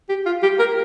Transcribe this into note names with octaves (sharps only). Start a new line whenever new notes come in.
G4
F4
G4
A#4